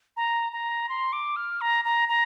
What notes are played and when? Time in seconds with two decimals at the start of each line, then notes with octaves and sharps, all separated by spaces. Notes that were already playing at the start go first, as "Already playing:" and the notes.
0.17 A#5
0.52 A#5
0.89 C6
1.13 D6
1.36 F6
1.61 A#5
1.85 A#5
2.09 A#5